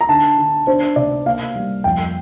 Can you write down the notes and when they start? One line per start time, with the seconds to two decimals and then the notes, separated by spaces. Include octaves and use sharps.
0.01 A#5
0.09 D3 A5
0.38 D3
0.67 D4 C5
0.96 C3 D5
1.26 A#3 F5
1.56 G3
1.84 F2 G5